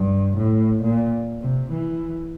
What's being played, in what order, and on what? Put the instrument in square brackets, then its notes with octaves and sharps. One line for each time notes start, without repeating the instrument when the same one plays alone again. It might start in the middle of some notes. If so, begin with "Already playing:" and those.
Already playing: [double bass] G2
A2
A#2
C3
E3